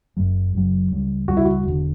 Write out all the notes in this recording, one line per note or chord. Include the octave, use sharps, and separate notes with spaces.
F#1 F#2 C#3 F#3
F#1 F#2 C#3 F#3
C#2 C#3 G3
C#2 C#3 G3 F#4
E4
F#4
E1 E2 D3